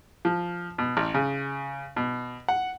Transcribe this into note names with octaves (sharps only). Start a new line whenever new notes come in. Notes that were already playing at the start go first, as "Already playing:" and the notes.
F3
B2
A1
C#3
B2
F#5